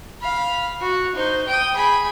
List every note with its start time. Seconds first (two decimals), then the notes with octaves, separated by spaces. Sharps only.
0.21 F5 B5
0.80 F#4
1.16 D#4 C5
1.47 G5 D#6
1.75 G#4 B5